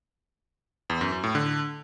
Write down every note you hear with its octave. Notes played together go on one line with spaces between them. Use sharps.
E2
F#2
F#2
A2
D3